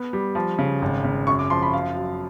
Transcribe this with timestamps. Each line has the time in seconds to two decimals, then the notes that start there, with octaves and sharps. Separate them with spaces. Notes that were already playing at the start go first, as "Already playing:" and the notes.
Already playing: B3
0.13 G3
0.35 F3
0.58 C#3
0.82 G#1
1.04 C#3
1.27 F#2 C#6
1.39 D6
1.50 F3 C6
1.62 B5
1.74 F#2 F5
1.96 F#3